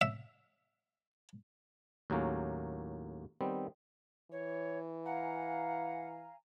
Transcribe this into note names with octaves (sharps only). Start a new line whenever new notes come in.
E5
D#2 A2 F#3 A#3 C#4
D#3 G3 B3 C4
E3 C#5
F5 F#5 G#5 A#5